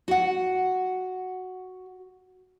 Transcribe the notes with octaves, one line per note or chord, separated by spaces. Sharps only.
F#4 F#5